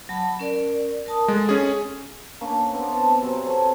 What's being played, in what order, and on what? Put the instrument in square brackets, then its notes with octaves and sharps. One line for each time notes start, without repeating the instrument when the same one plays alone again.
[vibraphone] F#3 A5 B5
C#4 A#4 D5
A#4 A5 D#6
[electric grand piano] G#3 [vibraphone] A4
[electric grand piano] C#4 G#4
[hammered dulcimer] A#3 C#4 D4
B3 C4 D4
D#5 E5 A5
C3 F#3 C4 G#5
A4 C#5